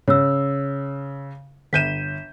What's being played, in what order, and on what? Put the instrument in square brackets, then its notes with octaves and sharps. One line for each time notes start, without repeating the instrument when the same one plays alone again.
[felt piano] C#3 [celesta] C#5 E6
[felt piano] G1 G6 D#7 [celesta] B6 E7